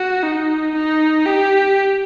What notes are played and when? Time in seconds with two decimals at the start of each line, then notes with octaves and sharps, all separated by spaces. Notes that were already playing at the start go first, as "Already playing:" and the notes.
Already playing: F#4
0.23 D#4
0.75 D#4
1.26 G4